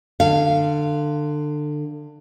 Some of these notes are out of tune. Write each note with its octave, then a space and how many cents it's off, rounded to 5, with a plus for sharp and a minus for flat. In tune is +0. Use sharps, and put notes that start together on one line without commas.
D3 +25 F5 -15